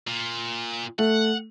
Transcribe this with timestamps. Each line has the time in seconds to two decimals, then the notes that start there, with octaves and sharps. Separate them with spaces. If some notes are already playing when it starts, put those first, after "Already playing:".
0.08 A#2
0.98 A3 F#5